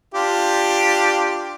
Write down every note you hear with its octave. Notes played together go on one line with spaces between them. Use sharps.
D4 F4 G4